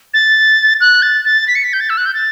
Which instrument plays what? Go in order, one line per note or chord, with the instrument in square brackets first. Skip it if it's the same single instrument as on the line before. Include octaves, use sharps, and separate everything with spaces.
[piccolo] A6
F#6
A6
A6
B6
C#7
B6
G6
A6
E6
F#6
G6
A6